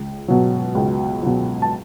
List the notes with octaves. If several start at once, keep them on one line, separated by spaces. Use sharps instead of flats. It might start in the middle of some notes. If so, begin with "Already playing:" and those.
Already playing: C#2
B2 F#3
C#2
B2 F#3
A5